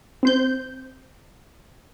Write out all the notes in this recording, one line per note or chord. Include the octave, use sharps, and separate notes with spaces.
C4 C5 G6